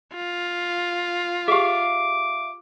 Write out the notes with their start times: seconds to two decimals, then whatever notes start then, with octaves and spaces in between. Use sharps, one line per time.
0.14 F4
1.48 G4 G#4 E5 F5 D6